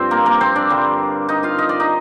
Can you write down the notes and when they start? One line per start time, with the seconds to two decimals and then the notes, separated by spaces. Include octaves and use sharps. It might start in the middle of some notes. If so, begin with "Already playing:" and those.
Already playing: G2 F3 C4 G4 C5
0.11 A#3 A#4
0.26 A#3 A#4
0.41 C4 C5
0.56 D4 D5
0.69 G2 D3 G3
1.29 D#4 D#5
1.43 F4 F5
1.59 D#5
1.69 D5
1.80 D#4 D#5